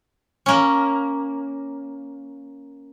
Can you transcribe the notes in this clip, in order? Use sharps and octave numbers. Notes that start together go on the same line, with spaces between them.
A#3 C#4